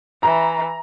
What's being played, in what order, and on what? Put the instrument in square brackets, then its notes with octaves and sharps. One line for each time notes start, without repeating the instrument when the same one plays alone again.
[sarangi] E3 [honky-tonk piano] A#5